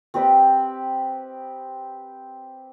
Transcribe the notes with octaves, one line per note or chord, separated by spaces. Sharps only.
C4 G4 B4 D#5